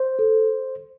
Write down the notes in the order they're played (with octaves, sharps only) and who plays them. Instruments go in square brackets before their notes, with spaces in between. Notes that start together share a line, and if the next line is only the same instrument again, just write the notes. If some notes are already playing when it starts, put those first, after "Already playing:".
Already playing: [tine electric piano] C5
[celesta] A4